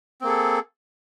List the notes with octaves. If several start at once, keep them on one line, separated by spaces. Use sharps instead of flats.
A#3 C4 G#4 A4